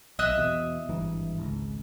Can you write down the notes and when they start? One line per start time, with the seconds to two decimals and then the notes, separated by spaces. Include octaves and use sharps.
0.19 B1 D#5 E5 F#6
0.36 E2 B2
0.89 G#1 G2 E3
1.38 G#1 C#2